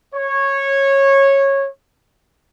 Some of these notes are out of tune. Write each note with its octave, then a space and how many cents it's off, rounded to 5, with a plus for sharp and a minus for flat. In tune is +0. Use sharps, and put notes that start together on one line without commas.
C#5 -15